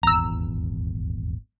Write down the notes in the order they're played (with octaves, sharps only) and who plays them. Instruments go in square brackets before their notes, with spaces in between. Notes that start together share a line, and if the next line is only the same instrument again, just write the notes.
[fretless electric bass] D#1 G#1 E2 [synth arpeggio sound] A#5 E6